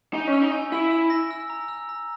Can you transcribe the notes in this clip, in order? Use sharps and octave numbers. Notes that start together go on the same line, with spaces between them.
D#4 G#5
C#4
E6
D#4
G#5
E4 E6
E6
A#6
E6
A#5
E6
A#5